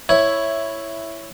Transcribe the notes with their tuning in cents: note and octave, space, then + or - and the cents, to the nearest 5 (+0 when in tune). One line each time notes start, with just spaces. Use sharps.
E4 +0 C#5 +0